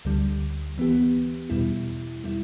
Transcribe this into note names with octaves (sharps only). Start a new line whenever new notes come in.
D2 D3 G3
E3 B3 G4
E2 B2 G3 E4
G3 E4